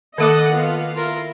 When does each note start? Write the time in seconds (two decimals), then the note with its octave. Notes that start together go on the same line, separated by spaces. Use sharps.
0.18 D#3 A#3 A4 D#5 F#5 D6
0.52 B3 F4 F5
0.96 E4 F4 A#4